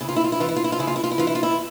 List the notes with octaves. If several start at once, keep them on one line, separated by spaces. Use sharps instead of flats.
C#3 E4
F4
E4
F4
E4
E3 F4
E4
F4
E4
F4
C#3 E4
F4
E4
F4
E4
E3 F4
E4
F4
E4